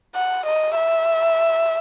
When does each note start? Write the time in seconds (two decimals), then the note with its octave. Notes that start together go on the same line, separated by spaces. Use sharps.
0.15 F#5
0.46 D#5
0.76 E5